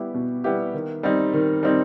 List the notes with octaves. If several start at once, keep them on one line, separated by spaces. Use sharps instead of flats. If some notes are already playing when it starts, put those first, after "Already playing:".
Already playing: G3 B3 E4 G4
B2
G3 B3 E4 G4
D#3
G3 C4 D#4
D#3
G3 C4 D#4